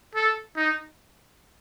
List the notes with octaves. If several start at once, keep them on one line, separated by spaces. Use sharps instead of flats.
A4
D#4